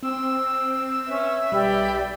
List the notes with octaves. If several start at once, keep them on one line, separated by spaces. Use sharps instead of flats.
C4 E6
C#4 B4 E5
B1 G3 G4 D5 B5